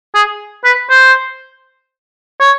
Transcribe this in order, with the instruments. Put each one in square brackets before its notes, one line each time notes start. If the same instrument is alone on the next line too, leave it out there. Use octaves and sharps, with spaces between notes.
[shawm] G#4
B4
C5
C#5